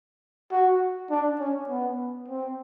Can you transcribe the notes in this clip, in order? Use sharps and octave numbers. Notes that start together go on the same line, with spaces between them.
F#4
D4
C#4
B3
C4